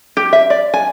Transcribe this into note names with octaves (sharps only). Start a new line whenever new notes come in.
G4
E5
D5
G#5